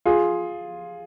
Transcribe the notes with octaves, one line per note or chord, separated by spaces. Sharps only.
F4 G#4